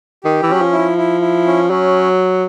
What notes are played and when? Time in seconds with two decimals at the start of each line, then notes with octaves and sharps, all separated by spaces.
0.24 D#3 G4
0.43 E3
0.49 F#3 C#4
0.61 F3
0.73 E4
0.79 F3
0.97 E4
1.21 E4
1.46 C#4
1.70 F#3 C#4